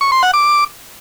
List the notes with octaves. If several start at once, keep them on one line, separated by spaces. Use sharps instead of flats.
C#6
C6
F#5
D6